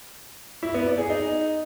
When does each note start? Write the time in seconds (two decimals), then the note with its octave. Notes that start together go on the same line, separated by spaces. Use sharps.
0.63 E4
0.74 B3
0.86 D5
0.98 G#4
1.10 D#4